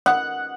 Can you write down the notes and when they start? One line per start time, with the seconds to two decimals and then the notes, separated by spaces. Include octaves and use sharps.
0.06 F#5